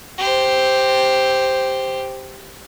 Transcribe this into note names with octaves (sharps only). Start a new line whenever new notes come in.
G4 C5